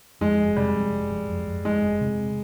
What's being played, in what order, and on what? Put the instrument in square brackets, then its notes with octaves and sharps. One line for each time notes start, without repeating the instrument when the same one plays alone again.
[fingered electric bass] F2 [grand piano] G#3
[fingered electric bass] F1
[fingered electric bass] C3 [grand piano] G3
[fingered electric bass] F2
F1
F2
F2
F2
[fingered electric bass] F2 [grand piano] G#3
[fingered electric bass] F1
C3